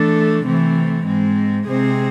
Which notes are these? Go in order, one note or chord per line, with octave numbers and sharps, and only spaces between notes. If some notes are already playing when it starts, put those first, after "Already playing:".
Already playing: E3 A3 D4 A4
C3 E3 A3 C4
G#2 G#3 C4
C3 G#3 C4 G#4 C5